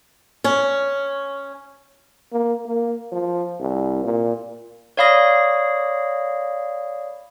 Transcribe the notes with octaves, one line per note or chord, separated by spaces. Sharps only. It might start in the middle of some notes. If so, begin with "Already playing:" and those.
C#4
A#3
A#3
F3
C2
A#2
C#5 D5 F5 B5 D#6 A#6